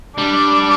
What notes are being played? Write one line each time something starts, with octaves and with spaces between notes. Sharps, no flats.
G3 D4